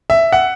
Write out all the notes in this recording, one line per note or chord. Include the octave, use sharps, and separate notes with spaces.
E5
F#5